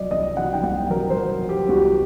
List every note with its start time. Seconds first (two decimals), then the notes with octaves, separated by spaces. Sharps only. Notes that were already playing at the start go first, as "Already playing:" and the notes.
Already playing: C2 F#3 D5 D#5
0.11 C2 D#5
0.37 F#3 F#5
0.53 G5
0.63 C2 F#5
0.90 F#3 A#4
1.10 C5
1.17 F#3
1.42 F#3
1.49 G4
1.69 C2 F#4